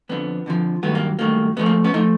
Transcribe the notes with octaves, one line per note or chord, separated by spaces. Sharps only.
F2 D3 F3 B3
F2 D3 F3
G2 D#3 F#3 A3 B3
A#3
G2 D#3 F#3 A3 A#3
G#2 F3 A3 B3
A#3
B3 C#4
F3 A3 D#4